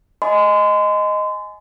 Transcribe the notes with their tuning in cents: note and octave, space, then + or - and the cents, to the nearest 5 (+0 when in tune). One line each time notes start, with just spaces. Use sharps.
D#5 +0 G#5 +15 C6 -35